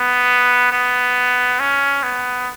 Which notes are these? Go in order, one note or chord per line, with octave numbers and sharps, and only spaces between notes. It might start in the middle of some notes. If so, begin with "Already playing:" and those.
Already playing: B3
B3
C#4
B3